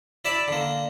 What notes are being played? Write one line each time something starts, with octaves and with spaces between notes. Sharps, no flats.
E4 D5 E5 A5 B5
D3 A#3